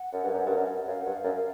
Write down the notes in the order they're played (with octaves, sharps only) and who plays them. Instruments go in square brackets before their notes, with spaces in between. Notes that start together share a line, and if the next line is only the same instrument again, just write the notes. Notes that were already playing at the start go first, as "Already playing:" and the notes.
Already playing: [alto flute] F#5
[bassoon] F#2
G2
F#2
G2
F#2
[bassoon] F#2 [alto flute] F5
[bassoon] G2 [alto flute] F#5
[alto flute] F5
[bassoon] F#2